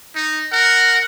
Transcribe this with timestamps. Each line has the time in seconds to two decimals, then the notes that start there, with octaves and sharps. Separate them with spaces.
0.15 D#4
0.52 A#4 F#5